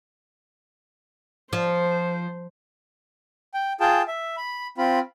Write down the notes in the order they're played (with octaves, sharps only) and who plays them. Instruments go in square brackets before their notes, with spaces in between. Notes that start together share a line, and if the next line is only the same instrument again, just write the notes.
[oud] F3 [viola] C5
[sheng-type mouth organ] G5
F4 G#4 G5 A5
E5
B5
C4 F4 B5